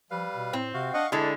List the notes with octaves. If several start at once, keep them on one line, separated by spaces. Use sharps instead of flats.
F3 G3 B4 F5
B2
A2 C4
C3 F#4 F5
D4 D#5 F5 F#5 C#6
D3 G#3 D4 E4 A4